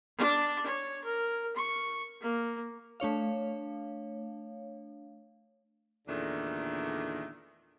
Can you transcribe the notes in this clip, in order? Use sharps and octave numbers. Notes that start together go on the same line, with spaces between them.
D4
C#5
A#4
C#6
A#3
A3 D4 C#5 F5
E2 A#2 D3 D#3 A3 D4